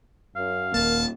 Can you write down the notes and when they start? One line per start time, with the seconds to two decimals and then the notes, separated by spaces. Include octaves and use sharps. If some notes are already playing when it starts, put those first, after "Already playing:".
0.36 F#2 F5
0.74 D#1 E2 A#3 A#4 A5